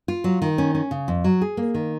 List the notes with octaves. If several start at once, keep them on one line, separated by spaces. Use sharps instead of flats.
F4
F#3
D#3
C#4
C#4
C#3
F2
F#3
G#4
A#3
D#3